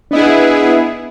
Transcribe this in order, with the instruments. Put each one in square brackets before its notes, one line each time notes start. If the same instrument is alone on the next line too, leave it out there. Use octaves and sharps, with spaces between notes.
[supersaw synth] B3 E4 G#4 [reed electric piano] D4 D#5